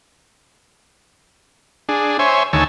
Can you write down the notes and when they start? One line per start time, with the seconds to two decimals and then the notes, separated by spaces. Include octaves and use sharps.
1.89 D4 G#4
2.19 C5 C#5 E5 G#5
2.53 D2 D#3 C#5 G#5 A5 E6